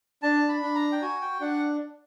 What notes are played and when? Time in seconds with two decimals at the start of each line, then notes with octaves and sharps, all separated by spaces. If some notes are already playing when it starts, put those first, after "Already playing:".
0.23 D4 A5
0.49 B5
0.62 D4
0.75 A#5
0.92 G5
1.02 F#4 G#5
1.21 G5
1.41 D4 F#5